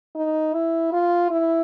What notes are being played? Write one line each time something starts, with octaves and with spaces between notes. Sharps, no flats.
D#4
E4
F4
E4